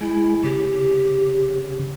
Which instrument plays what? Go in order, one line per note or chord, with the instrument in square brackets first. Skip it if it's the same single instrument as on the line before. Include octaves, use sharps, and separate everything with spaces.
[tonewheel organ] G#3 [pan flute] E4
[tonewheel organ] C#3 [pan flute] G4